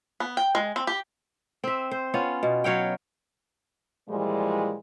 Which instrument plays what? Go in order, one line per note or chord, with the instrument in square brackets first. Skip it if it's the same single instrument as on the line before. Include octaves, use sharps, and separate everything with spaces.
[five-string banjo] B3
G5
G#3
C4
G4
[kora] C4 E5
C5
B3 C#4 F4
B2
F#3 C#5 F5 G5
[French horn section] A#2 E3 F3 G3 G#3